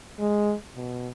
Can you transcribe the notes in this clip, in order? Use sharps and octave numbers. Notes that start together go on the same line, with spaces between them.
G#3
B2